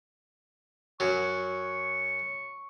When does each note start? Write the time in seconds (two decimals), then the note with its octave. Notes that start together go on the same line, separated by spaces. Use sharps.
1.00 F#2 F#3 C#6